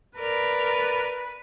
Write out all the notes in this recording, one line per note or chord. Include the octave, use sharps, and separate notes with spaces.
A#4 B4 D5